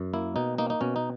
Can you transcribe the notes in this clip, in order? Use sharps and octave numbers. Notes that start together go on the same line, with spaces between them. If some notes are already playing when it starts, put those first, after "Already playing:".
Already playing: F#2
A#3 E4
B2 D#4
A#3 D#4
D#4
B2 C#4
D#4